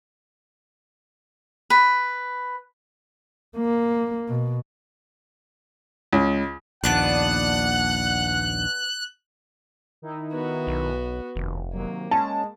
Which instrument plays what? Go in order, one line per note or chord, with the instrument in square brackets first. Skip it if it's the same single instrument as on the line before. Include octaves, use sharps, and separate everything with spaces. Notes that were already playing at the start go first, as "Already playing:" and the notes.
[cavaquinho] B4
[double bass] A#3
B2
[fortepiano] C#2
[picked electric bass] A#1 D#2 [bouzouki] B3 D4 B4 [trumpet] F#5 [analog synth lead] F#6
[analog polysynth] D#3 D#4 E4
[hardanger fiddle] B3 F#4
[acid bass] B1
[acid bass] F1 [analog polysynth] D#2
[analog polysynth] C3 D#3 F#3 [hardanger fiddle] A#3
[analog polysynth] G#3 [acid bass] C#4 [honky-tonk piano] A5